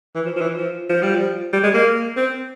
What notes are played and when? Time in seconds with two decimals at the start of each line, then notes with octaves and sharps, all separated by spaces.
0.15 E3
0.26 F3
0.36 F3
0.41 E3
0.57 F3
0.89 F3
1.02 G3
1.15 F3
1.53 G3
1.63 G#3
1.74 A#3
2.16 C4